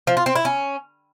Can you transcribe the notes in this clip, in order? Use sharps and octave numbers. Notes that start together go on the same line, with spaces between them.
F3
F4
C4
E4
C#4